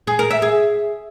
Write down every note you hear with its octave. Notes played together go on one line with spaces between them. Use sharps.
G#4
A#4
E5
G#4